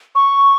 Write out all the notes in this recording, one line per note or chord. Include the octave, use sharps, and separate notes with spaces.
C#6